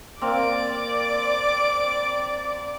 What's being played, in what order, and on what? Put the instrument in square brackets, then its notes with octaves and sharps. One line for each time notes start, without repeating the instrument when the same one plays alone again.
[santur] A#3 C4 [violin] D5 D6